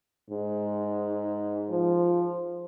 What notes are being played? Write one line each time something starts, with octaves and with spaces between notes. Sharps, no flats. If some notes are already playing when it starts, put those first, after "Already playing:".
G#2
F3